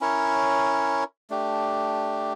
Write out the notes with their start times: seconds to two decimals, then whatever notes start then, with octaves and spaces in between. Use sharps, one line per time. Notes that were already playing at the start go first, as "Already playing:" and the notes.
0.01 C#4 E4 A#4 C#5
1.30 A3 D4 G4